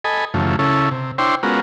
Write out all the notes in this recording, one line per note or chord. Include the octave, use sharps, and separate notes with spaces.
A4 D#5 G#5 B5
F#2 C#3 E3 F3 A3
C#3 C#4 E4 A4
C3
D4 E4 C5 C#5 G5 C6
G#3 B3 C#4 F4 F#4 A#4